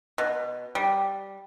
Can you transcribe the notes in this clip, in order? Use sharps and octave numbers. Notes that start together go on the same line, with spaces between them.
B2
G3